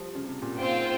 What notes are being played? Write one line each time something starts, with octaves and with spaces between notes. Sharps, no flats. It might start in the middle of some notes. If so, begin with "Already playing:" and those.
Already playing: F3 G3
C#3
C3
A#2
A#2 C4 F4 C5 G5
G#2